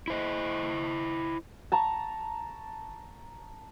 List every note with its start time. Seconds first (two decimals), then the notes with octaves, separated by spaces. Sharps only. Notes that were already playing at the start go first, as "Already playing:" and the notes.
0.08 E4 C5 D#5
1.72 A5 A#5 C#6